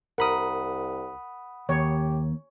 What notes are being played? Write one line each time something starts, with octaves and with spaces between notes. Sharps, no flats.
C2 A#4 F#5 B5 D#6
D#2 G4 C#5